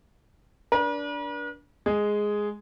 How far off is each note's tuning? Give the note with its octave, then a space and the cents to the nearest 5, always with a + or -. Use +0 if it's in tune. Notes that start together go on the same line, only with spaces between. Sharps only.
D4 -15 B4 -45
G#3 +0 G#4 +0